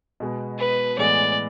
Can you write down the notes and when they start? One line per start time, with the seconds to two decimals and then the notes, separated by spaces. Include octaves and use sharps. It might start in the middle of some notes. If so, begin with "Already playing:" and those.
0.20 B2 G#3 B3
0.59 B4
0.98 A2 E3 G#3 B3 D5